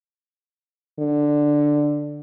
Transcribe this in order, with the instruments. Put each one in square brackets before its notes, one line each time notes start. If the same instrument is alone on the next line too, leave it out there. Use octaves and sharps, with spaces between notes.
[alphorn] D3